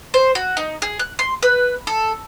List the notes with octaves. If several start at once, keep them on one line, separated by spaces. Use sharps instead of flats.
C5
F#4
D#4
G#4
F#6
C6
B4
A4